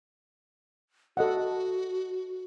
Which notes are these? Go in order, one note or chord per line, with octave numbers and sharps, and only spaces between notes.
F#4 A4 D#5 F#5